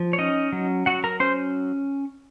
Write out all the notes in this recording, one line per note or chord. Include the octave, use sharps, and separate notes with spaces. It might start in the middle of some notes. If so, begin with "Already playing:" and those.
Already playing: F3
C#5
C#4 D#4 D#5
F#3
F#3 F#4 F#5
A#4 A#5
C#4 C5 C6